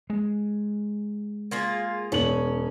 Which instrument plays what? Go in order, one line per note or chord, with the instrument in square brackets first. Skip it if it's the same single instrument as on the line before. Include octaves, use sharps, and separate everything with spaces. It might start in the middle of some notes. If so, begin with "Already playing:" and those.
[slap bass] G#3
[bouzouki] A#3 F4 G#4
[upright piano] E1 F#7 [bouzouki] C#4